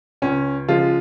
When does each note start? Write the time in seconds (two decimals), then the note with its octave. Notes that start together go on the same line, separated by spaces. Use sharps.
0.22 C#2 C#4
0.69 C#3 F3 G#3 F4